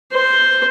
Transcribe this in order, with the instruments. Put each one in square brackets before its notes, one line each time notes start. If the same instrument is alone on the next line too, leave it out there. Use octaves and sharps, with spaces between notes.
[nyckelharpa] C5